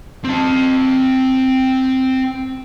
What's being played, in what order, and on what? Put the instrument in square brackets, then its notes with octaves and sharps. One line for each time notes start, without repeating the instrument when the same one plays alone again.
[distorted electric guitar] C4 A5